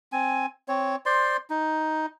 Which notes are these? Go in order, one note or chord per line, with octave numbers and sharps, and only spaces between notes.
C4 G#5
C4 C#5
C5 D5 C6
D#4